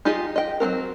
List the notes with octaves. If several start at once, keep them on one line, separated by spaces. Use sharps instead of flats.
D#4 F4 G4 G#4 D#5
D#5 G5
F#3 A#3 C4 A#4